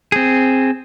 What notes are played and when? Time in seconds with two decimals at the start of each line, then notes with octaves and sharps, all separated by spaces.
0.12 C4 G#4